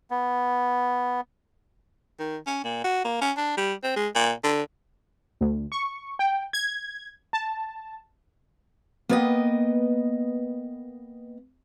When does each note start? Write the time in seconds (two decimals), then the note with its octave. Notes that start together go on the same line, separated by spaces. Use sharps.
0.11 B3
2.19 D#3
2.47 C#4
2.64 A#2
2.84 F#4
3.05 A#3
3.21 C#4
3.37 D4
3.57 G3
3.83 C4
3.96 G#3
4.15 A#2
4.44 D3
5.41 D2
5.72 C#6
6.19 G5
6.53 G#6
7.33 A5
9.09 A#3 B3 B4 D5 D#5 G5